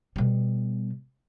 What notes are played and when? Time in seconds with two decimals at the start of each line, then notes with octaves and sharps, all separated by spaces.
0.16 B2 G3